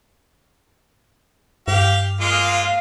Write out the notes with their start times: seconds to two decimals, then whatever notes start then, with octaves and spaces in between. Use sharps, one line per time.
1.68 G2 G4 F5
2.20 G#3 A#3 F4 F5